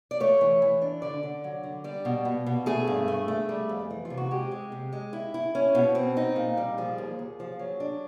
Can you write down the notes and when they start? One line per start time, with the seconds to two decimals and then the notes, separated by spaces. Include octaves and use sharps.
0.11 D5
0.20 A3 C#5
0.41 E3
0.62 E3
0.82 D4
1.02 D3 D5
1.23 D3
1.44 F#3
1.63 D3
1.84 G3 D5
2.05 B2
2.25 B2
2.46 B2
2.66 A3 G#4
2.87 G2
3.08 A3
3.28 A3
3.49 G3
3.69 F2
3.91 E3
4.05 F4
4.10 C3
4.17 F#4
4.31 G#3 G4
4.52 G#3
4.72 C3
4.93 G#3
5.13 E4
5.34 E4
5.55 C#4
5.75 B2
5.95 C4
6.17 D#4
6.36 A#2
6.57 G3
6.78 F3 G#4
6.98 D#2
7.19 D#2
7.40 F3
7.59 F#3
7.80 D4